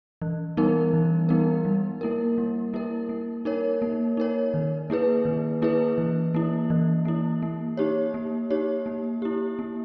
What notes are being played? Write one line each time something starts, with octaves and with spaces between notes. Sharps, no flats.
E3
G3 B3 D#4 A#4
E3
G3 B3 D#4 A#4
G3
A#3 E4 A#4
G3
A#3 E4 A#4
A#3
D#4 A#4 C#5
A#3
D#4 A#4 C#5
D#3
A#3 E4 G#4 B4
D#3
A#3 E4 G#4 B4
E3
A#3 E4
E3
A#3 E4
A#3
D#4 G4 C#5
A#3
D#4 G4 C#5
A#3
E4 G4
A#3